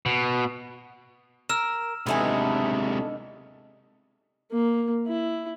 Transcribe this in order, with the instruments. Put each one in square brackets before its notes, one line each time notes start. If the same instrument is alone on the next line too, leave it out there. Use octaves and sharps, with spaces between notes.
[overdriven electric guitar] B2
[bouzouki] A#4 [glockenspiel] E6 F6 E7
[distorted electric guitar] C3 G#3 [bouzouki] E3 A3 G#5 [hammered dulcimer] B3 D4 D#4
[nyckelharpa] A#3
E4